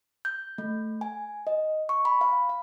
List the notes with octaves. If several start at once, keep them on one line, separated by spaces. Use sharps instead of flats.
G6
A3
G#5
D#5
C#6
B5
F5
F5